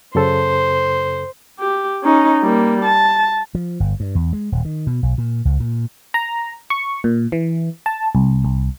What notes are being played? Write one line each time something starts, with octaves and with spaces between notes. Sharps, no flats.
F#2 C#3 A4 C5
G4
C#4 D#4
G3 A#3
A5
F3
G1
G2
E2
G#3
D#1
D#3
B2
B1
A#2
C#2
A#2
A#5
C#6
A#2
E3
A5
C2
C2